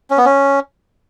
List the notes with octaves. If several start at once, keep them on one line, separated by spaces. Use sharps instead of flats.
C#4
B3
C#4